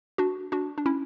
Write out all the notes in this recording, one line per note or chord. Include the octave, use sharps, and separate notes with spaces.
D4 F#4
D4 F#4
D4
C#4 E4